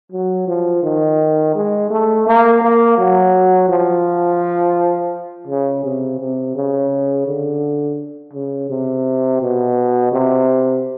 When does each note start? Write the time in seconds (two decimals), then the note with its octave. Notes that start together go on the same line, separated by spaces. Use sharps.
0.12 F#3
0.48 F3
0.83 D#3
1.55 G#3
1.91 A3
2.27 A#3
2.62 A#3
2.98 F#3
3.69 F3
5.48 C#3
5.84 C3
6.19 C3
6.55 C#3
7.26 D3
8.34 C#3
8.70 C3
9.41 B2
10.12 C3